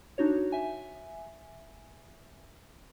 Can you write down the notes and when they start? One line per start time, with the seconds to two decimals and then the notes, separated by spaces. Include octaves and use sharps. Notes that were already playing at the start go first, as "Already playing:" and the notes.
0.18 D4 D#4 F#4 C#5
0.52 E5 G#5